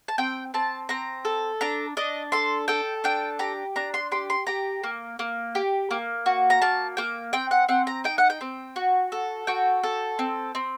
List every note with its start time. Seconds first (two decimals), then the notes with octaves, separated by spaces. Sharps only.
0.08 A5
0.18 C4 G5
0.54 C4 A5
0.89 C4 A#5
1.25 A4
1.61 D4 A#5
1.97 D4 D#5
2.32 A4 C6
2.68 A4 G5
3.04 D4 G5
3.39 G4 A#5
3.76 D4 A#5
3.94 C6
4.11 G4 C6
4.30 C6
4.47 G4 A#5
4.84 A#3
5.19 A#3
5.55 G4
5.91 A#3
6.26 F#4
6.50 A#5
6.62 A#3 A5
6.97 A#3 G5
7.33 C4 G5
7.51 F#5
7.69 C4 F#5
7.87 A#5
8.04 D#4 G5
8.18 F#5
8.30 G5
8.41 C4
8.76 F#4
9.12 A4
9.47 F#4 G5
9.83 A4
10.19 C4
10.55 C4